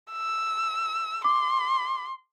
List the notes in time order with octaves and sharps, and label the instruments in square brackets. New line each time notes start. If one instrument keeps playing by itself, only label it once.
[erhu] E6
[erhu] C6 [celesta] D6